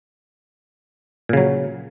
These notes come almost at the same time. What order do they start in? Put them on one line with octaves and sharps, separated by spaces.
A#2 C#3 F#3